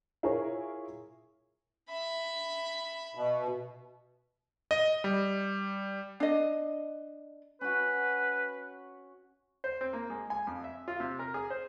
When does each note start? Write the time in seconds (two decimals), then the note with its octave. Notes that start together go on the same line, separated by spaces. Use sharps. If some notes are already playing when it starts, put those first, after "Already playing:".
0.23 E4 F4 G#4 A#4 C#5
1.90 E5 B5
3.15 B2
4.71 D#5
5.04 G3
6.20 D4 D#5
7.61 C#4 F#4 B4
9.64 C5
9.81 C4
9.93 A#3
10.10 G#3
10.30 G#5
10.47 F2
10.64 E5
10.88 F4
11.00 C3
11.19 A#4
11.34 G#4
11.50 C5